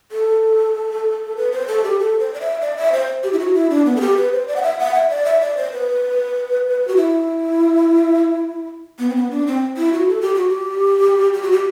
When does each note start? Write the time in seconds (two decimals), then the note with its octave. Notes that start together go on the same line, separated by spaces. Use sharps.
0.12 A4
1.37 B4
1.52 C5
1.68 A4
1.84 G4
1.99 A4
2.20 C5
2.34 D5
2.41 E5
2.61 D5
2.77 E5
2.92 C5
3.24 G4
3.33 E4
3.40 F#4
3.54 E4
3.70 D4
3.85 B3
3.96 A4
4.01 G4
4.17 B4
4.32 C5
4.48 D5
4.56 F#5
4.63 E5
4.79 F#5
4.95 E5
5.10 D5
5.25 E5
5.41 D5
5.57 C5
5.72 B4
6.88 F#4
6.97 E4
8.99 B3
9.09 C4
9.16 B3
9.31 D4
9.47 C4
9.77 E4
9.93 F#4
10.09 A4
10.21 G4
10.35 F#4
10.49 G4
11.33 G4
11.43 F#4
11.52 G4